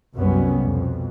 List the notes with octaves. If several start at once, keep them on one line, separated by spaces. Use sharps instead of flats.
C2 F#2 G3 B3 C#4
F2 B2